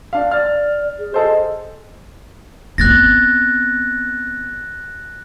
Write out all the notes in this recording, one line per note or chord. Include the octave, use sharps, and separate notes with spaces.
D4 F5
D5 F6 A6
G#4
G#4 A4 C5 D#5
B3 C4 F#6 A6 A#6